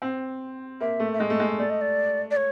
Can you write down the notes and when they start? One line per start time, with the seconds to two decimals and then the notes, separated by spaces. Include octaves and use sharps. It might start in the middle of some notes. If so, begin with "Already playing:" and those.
0.02 C4
0.81 A#3 E5
1.00 A3
1.13 E5
1.19 G#3 D#5
1.30 A3
1.40 G#3
1.58 A3 D5
1.70 D#5
1.81 D5
2.31 D5
2.37 C#5